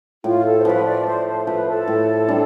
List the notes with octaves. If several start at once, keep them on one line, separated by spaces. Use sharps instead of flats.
A2 F4
A4
C5
F3 A3 B4
D5
A2 C5
C5
F3 A3 B4
A4
A2
G3 D4